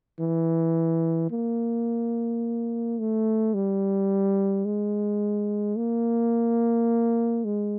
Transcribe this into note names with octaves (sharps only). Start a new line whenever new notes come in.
E3
A#3
A3
G3
G#3
A#3
G#3